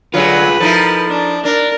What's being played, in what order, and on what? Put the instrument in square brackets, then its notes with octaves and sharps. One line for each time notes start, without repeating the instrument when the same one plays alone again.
[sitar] D3 F#3 [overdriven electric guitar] F4 G#4 [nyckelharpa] B4
[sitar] F3 D#4 E4 [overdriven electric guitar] A4 A#4
[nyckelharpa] D4
[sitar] D4 [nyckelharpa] A#4